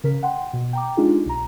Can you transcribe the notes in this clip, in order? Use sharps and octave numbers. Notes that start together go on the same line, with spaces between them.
C#3 A#4 B6
F#5 G5 C6
B2
G5 A#5 D6
G#3 D4 D#4 F4 G4 G#4
B1 A#5